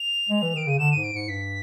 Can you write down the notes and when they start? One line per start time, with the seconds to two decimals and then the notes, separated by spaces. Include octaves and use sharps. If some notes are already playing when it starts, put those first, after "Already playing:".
Already playing: F7
0.29 G#3
0.42 E3
0.55 D#3 D7
0.67 C#3 D#7
0.79 D3 E7
0.91 G#2 D#7
1.04 D7
1.12 G#2 C#7
1.28 G2 B6